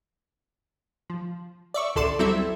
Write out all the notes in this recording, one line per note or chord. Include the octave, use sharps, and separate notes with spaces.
F3
D5 E5 C#6
A1 D2 A4 D5 C6 E7
F#3 G3 C4 E4 A4 E5